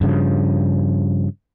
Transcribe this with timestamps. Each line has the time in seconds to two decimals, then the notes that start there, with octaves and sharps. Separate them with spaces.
0.01 G2 C#3 F3